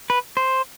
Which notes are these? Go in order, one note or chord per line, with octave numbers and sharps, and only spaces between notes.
B4
C5